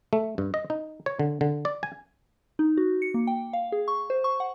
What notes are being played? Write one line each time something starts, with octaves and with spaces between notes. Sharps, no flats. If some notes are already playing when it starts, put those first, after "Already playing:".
A3
G2
D#5
D#4
C#5
D3
D3
D5
G#5
D#4
F#4
C#7
A#3
G5
F5
G#4
C#6
C5
C#6
F#5